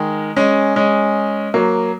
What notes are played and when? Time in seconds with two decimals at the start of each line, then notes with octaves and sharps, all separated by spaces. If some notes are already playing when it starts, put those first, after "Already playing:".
Already playing: D#3 G#3
0.36 G#3 C#4
0.76 G#3 C#4
1.54 F#3 A#3